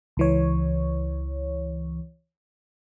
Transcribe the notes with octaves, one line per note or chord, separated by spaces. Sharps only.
C#2 E3 C#5